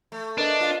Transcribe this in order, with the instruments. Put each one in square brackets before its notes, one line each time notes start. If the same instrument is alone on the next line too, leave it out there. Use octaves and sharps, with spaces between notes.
[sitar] A3
[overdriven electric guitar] D4 [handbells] A#4 B4 D#5
[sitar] F4